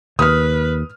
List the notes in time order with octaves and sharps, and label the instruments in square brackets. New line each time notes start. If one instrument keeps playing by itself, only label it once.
[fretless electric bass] D#2 [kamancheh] B4 [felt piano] D#6 F6